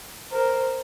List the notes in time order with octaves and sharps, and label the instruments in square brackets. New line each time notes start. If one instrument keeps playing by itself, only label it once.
[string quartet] A#4 C5